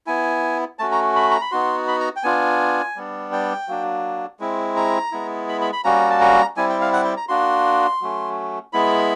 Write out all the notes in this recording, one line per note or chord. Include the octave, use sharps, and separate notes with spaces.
B3 E4 G#5
A3 C#4 F#4 A5
A#5
B5
A#5
B5
B3 D#4 F#4 C6
B5
A#5
G5
B3 D4 F4 G#5
G3 B3 D4
G5
F#3 A#3 D4
G#3 C4 E4
A#5
G#3 B3 E4
B5
B5
B5
G3 A#3 C#4 F#4 A#5
A5
A#5
G3 C4 E4 G#5
G5
F5
F#5
G5
A#5
A#3 D4 F#4 C6
F#3 A3 C#4
G#3 B3 E4 B5